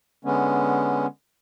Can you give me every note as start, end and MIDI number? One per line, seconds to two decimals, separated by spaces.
0.25 1.06 50
0.25 1.06 56
0.25 1.06 59
0.25 1.06 61